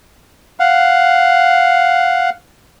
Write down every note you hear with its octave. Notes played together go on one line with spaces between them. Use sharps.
F5 F#5